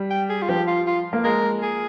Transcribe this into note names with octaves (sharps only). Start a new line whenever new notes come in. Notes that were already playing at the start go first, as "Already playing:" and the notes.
Already playing: G3
G5
G#4
F4
F3 G4
F4
F4
A#3
G#3 A#4
G#4